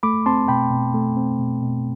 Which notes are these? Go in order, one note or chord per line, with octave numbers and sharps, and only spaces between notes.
A3 B5 D6
C4 A5 C6
B2 G5 B5
B2
A3
C4
B2
B2